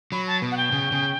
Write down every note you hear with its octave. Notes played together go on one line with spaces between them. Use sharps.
F#3 B5
A5
B2
F#5
G5
C#3
C#3